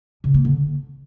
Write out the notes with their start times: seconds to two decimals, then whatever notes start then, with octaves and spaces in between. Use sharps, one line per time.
0.24 C#3
0.34 A#3
0.45 D3